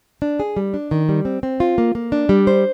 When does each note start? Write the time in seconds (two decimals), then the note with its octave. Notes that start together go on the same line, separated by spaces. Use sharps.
0.22 D4
0.40 G#4
0.57 G3
0.74 D4
0.91 D#3
1.09 G3
1.25 C4
1.43 C4
1.60 F4
1.78 A#3
1.95 A#3
2.12 D4
2.29 G3
2.47 C5